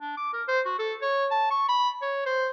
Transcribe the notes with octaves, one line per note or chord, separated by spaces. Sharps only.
D4
D6
A#4
C5
F#4
A4
C#5
A5
C#6
B5
C#5
C5